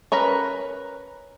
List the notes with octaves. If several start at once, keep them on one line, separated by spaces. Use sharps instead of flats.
C#4 A#4 B4 A#5